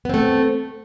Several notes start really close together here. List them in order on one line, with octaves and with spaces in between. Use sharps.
B3 C4 A3